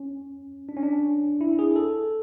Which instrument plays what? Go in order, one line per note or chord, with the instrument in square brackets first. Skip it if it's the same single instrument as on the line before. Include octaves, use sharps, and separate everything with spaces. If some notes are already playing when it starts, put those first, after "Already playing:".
Already playing: [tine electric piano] C#4
D4
C#4
D4
E4
G#4
A4